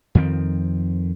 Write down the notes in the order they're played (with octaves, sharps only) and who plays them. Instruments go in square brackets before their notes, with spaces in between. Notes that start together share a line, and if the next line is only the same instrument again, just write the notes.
[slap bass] F2 D#3 F3 C4